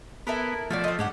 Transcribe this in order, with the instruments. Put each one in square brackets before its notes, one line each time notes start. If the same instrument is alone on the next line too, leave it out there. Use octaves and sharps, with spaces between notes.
[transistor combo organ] B3 [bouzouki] E4 A4 A#4
[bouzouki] B2 F#4 D5 [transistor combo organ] F3 A3
[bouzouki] C4 D#5
[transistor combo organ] G#2 [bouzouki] D4 G4 F#5